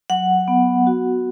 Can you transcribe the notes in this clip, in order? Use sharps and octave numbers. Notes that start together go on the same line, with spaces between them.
F#3 F#5
B3
F#4